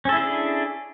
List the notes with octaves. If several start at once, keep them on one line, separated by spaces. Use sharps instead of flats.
C#4 D4 E4 G#4 A4